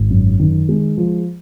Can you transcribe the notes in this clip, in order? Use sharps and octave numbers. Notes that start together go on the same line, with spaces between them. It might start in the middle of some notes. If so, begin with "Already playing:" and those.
Already playing: G#1
F#2
D#3
G#3
F3